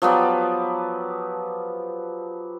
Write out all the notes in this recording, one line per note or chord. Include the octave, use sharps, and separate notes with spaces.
F3 F#3 B3 G4